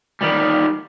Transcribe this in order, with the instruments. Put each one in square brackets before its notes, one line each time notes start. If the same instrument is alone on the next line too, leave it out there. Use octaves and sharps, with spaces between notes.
[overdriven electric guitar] D#3 G3